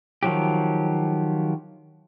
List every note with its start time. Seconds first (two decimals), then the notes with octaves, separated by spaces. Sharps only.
0.23 D#3 F3 F#3 G4